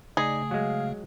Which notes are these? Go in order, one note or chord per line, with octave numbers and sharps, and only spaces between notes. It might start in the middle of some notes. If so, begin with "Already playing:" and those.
C#3 A3 D#4 G#4 D5
F#3 G#3 F5